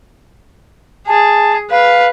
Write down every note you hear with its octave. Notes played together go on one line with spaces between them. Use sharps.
G#4 A5
B4 F5